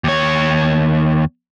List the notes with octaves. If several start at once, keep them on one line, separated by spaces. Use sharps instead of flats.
D#2 C#5